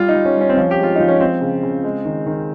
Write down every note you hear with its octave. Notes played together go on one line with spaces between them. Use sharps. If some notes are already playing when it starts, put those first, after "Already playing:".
Already playing: G3 F4
D#4
G3
C#4
G3
C#4
C4
F3 C#4
G4
G#3
F4
F3 D#4
C#4
F3 C4
C#3
C#3
G#3
D#3
D#3